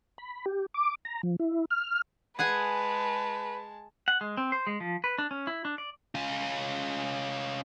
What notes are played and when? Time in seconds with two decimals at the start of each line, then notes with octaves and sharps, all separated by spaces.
0.18 B5
0.46 G4
0.74 D6
1.05 A#5
1.23 F3
1.39 E4
1.70 F6
2.39 G#3 G#4 B4 F#5 G#5 A5
4.08 F#5
4.21 G#3
4.37 C4
4.52 C5
4.67 G#3
4.80 F3
5.04 B4
5.18 D4
5.31 C#4
5.47 E4
5.65 D4
5.78 D5
6.15 C#4 F4